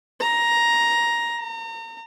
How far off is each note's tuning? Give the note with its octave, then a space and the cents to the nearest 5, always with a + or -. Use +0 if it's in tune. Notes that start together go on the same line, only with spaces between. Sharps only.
A#5 +10
A#5 -35